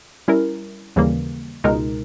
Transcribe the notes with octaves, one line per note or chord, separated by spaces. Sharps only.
G3 C#4 E4 A#4
D#2 C#3 E3 G3 A#3
C#2 B2 G#3 D#4 A#4